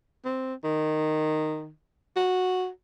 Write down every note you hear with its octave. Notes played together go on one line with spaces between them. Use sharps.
C4
D#3
F#4